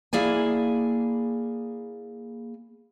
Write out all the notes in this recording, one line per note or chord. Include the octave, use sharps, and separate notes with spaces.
A#3 E4 G#4 D5 G#5